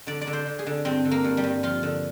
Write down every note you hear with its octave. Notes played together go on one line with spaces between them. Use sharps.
D3 D5
D5
D3
C5
D3
G#4
D3
G2 C4
D3
A#3
G2
G3
G2
F3 F4
D3